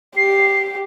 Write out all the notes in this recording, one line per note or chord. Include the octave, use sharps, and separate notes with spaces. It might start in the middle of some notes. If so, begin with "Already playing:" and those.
G4 C7